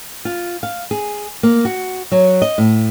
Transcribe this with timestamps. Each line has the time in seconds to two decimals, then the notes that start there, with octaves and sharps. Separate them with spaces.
0.25 F4
0.63 F5
0.91 G#4
1.43 A#3
1.65 F#4
2.12 F#3
2.42 D#5
2.58 A2